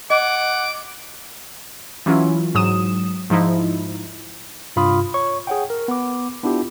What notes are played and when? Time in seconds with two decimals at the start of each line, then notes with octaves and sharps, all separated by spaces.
0.10 D#5 F#5 D6
2.06 E3 F#3 C#4 E4 F4
2.55 G#2 F#3 D#6 E7
3.30 G#2 F3 D#4 E4
4.76 G2 C3 F4 B5 D#6
5.14 C#5 C#6
5.47 G#4 C#5 F#5 G5
5.70 A#4
5.88 B3 D6
6.43 B3 D4 E4 F4 G4